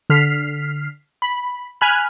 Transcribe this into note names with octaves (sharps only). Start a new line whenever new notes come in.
D3 F6 B6 C7
B5
G#5 B5 F6 F#6